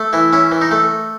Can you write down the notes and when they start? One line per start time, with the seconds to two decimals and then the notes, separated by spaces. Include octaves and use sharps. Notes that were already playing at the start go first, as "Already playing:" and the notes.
Already playing: A3
0.13 E3 E4
0.33 C#4 E4
0.52 E3
0.61 D#4
0.71 A3